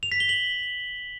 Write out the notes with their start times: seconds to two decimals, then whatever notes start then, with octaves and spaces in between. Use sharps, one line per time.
0.03 F7
0.12 B6
0.20 G7
0.29 F#7